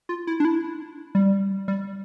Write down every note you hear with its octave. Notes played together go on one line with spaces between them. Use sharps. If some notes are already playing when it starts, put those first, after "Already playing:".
F4
E4
D4
E4
G3
G3